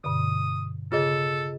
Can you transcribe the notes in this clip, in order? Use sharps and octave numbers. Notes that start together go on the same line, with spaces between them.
G2 B2 D3 D#6
C#3 F4 G#4 A4 D#5